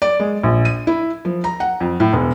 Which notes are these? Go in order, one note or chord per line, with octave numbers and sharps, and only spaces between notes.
D5
G#3
A#1
D#7
E4
F3
A#5
F#5
F2
A2
E1